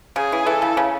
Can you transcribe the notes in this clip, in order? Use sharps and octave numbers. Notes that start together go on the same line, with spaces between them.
C#3 G#4
E3
E3 A4
C#3
C#3